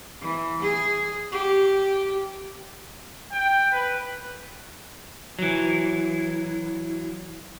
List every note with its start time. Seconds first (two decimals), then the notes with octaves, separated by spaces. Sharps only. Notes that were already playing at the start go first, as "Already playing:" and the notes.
0.21 E3
0.62 G#4
1.32 G4
3.32 G5
3.70 B4
5.39 E3 F#3